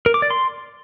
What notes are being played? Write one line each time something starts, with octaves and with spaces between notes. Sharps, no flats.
A#4
D6
D5
C6